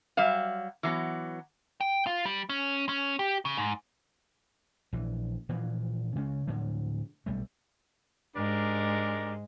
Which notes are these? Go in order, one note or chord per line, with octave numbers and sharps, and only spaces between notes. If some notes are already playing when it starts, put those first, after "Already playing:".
F#3 G3 E5 F5
E3 F#3 B3
G5
F4
G3
C#4
C#4
G4
C#3
G#2
A#1 E3
A#2 E3 F3
C#3 G#3 C#4
A2 D3 F3 F#3
B1 G3 A3
G#2 G#3 D4 G4 A#4